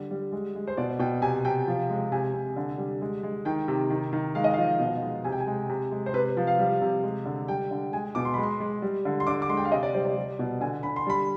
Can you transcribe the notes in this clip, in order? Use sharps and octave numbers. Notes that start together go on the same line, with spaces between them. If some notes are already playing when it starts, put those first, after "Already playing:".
Already playing: D3 G3
G3
G#3
G#3
C5
B2 D5
B2 G5
C3 G#5
C3 G5
F3
G#3
C3 G#5
C3
D3
G3
G#3
G#3
D#3 G5
C3
D#3
D#3
G#3 F5
D#5
F3 F5
B2
G#3
C3 G#5
G5
G#5
G#3
C3
G#3
C5
C3 B4
F3
F5
G3
C3
G#3
D3
G3 G5
D3
G#3 G#5
B2 D6
C6
G#3 B5
C6
G#3
G3
D3
C6
D3 D6
D6
G#3 C6
G5
F5
C3 D#5
D5
G3 C5
D5
G3
B2
D3 G#5
D3 B5
C6
G3 B5